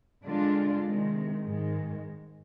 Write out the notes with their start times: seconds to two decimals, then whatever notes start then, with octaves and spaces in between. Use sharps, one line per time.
0.25 D3 G#3 D4 F4
0.86 C3 D#3 G#3
1.46 G#2 D#3 G#3